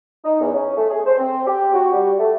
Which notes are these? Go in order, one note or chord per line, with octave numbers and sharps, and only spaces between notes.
D#4
E2
C#4
A3
G#4
C5
C4
G4
F#4
G3
A3